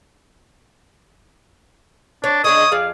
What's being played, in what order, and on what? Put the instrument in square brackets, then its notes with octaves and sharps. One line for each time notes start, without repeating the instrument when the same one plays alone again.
[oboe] D4 [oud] C#5
[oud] D4 G#4 D#5 [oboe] C#5 [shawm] D#6
[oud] F2 G#4 D5 [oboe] F5